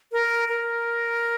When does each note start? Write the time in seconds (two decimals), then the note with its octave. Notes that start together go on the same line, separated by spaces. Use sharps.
0.12 A#4
0.48 A#4